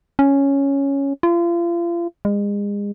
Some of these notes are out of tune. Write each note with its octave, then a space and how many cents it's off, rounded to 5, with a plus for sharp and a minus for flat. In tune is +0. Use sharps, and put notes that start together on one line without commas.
C#4 +0
F4 -35
G#3 -35